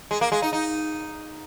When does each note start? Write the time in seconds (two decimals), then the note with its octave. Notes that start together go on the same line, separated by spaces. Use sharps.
0.11 G#3
0.21 A#3
0.32 G#3
0.42 D#4
0.53 D#4